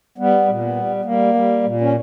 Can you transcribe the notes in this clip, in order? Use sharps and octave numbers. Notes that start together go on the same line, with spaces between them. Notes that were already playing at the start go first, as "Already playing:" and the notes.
G3 B3
A#2
B3
G3
G3 A#3
G3
A#2
C#4